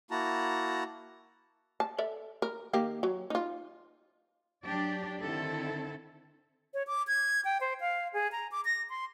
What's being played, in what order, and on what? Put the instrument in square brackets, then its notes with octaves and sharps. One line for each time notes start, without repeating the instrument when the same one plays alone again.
[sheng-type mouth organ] A#3 E4 F#4 A5 A#5
[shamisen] A5
A4 D5 E5
A#4
D#3 A#3 G4
F#3
D#4 F4
[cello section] F#3 D4 G4 D5
D3 D#3 C4 E4 A4
[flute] C#5
D6
G#6
G5
C5
F5
G#4
A#5
D6
A#6
C6